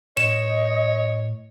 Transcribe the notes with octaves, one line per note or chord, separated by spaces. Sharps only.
A2 C#5 D#5 E7